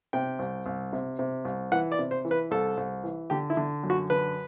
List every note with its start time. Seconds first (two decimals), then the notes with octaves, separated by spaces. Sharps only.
0.13 C3 G5
0.39 C2
0.66 C2
0.93 C3
1.19 C3
1.45 C2
1.72 E3 F#5
1.92 D5
1.99 C3
2.11 C5
2.25 E3
2.31 B4
2.51 C2 A4
2.77 C2
3.04 E3
3.30 D3 G4
3.50 E4
3.57 D3
3.84 F#2
3.90 F#4
4.10 D3 B4